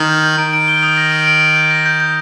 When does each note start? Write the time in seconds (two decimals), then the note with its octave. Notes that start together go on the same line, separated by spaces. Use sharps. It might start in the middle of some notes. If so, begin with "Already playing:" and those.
Already playing: D#3
0.09 G6
0.23 G6
0.38 D#3 D7
0.53 D7
0.68 G7
0.83 D#6
0.97 A#6
1.12 D7
1.27 D7
1.41 D7
1.56 G6
1.71 A#6
1.86 G6
2.00 G6